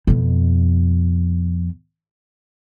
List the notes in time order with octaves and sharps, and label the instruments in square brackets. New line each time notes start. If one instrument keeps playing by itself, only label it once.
[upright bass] F2 B2